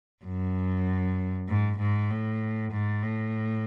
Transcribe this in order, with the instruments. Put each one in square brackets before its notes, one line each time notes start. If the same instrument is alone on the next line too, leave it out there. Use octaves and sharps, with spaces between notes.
[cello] F#2
G#2
G#2
A2
G#2
A2